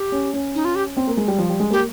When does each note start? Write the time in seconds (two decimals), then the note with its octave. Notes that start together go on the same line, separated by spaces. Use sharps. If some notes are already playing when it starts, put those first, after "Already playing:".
Already playing: G4
0.12 C#4
0.34 C#4
0.55 D#4
0.65 F4
0.75 G4
0.97 C4
1.07 A#3
1.17 G#3
1.28 G3
1.38 F3
1.49 G3
1.60 G#3
1.71 A#3 G4